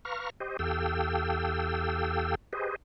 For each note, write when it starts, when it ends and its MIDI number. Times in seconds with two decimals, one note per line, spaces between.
0.05 0.30 71
0.05 0.30 77
0.05 0.30 82
0.05 0.30 85
0.05 0.30 89
0.40 0.57 67
0.40 0.57 72
0.40 0.57 75
0.59 2.35 40
0.59 2.35 67
0.59 2.35 69
0.59 2.35 77
0.59 2.35 79
0.59 2.35 88
2.53 2.76 67
2.53 2.76 68
2.53 2.76 71
2.53 2.76 72
2.53 2.76 75